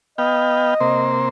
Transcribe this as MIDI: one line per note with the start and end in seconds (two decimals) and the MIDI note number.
0.18 0.74 59
0.18 1.13 75
0.18 0.74 77
0.18 0.74 79
0.81 1.29 48
0.81 1.29 58
0.81 1.29 72